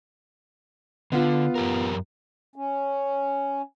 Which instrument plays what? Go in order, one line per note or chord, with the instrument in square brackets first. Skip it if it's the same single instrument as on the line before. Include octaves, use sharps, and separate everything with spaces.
[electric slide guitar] D3 [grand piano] B3 F4
[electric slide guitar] F#2 G4 A#4
[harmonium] C#4